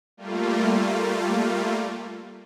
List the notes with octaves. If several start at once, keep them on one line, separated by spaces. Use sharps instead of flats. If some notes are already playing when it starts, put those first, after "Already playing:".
G3 A3 A#3 F4